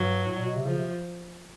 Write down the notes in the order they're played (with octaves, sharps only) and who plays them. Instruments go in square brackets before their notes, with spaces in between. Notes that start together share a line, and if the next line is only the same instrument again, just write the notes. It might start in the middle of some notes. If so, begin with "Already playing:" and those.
Already playing: [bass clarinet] G2 [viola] F#3
[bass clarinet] A2
A#2
B2
C3
[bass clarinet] C#3 [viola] F3
[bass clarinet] C3